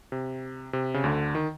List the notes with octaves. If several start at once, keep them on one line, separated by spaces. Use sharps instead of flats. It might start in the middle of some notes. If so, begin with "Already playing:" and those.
C3
C3
C#3
D2 D3
D#3